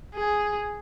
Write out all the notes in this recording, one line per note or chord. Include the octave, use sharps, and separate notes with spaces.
G#4